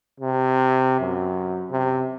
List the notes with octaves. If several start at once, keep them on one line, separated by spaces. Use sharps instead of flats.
C3
F#2
C3